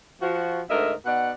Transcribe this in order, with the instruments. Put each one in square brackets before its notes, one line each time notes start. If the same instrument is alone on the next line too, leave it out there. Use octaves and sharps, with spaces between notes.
[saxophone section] F3 F#4
D2 G#2 A#4 D#5 E5
B2 D#4 D5 F#5